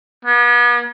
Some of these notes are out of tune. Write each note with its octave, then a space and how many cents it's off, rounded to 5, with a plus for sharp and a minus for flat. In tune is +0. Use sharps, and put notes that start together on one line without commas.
B3 -40